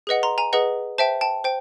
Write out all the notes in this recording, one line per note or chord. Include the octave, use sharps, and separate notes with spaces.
G#4 B4 D#5 F#5
A#5 C6
G#5 A#5
G#4 B4 D#5 F#5
C5 E5 G5 A5
G5 A5
C5 G5